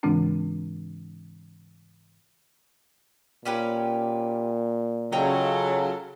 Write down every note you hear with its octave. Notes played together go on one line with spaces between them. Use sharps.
G#2 C#3 E3 G#3 C4 D4
A#2 C#4 G4 B4
C#3 F#3 F4 A4 C#5 D#5 G5